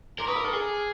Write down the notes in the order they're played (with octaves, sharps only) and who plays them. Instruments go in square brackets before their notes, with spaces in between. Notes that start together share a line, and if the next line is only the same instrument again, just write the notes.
[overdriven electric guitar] A#4 [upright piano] C6 D6
[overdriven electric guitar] B4 [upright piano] C#6 D#6
[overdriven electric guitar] A#4 [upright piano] D6 E6
[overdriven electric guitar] A4 [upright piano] D#6 F6
[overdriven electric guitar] G#4